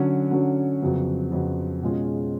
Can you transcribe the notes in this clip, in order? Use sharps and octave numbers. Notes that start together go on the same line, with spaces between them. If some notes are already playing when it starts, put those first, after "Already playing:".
Already playing: D3 F#3 C#4
D3 F#3 C#4
F2 C#3 F#3 B3
F2 C#3 F#3 B3
B2 G#3 C#4 F4 G#4